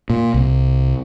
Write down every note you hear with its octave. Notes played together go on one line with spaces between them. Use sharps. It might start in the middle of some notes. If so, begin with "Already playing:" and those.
A#2
C2